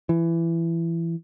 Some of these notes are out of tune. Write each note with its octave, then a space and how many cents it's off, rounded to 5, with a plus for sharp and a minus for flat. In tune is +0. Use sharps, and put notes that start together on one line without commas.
E3 +20